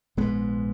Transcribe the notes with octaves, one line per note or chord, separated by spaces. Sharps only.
A#1 G#2 G#3 B3